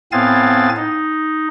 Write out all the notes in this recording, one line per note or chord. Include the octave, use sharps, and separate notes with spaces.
A2 B3 C4 F5 G#5 A6
D#4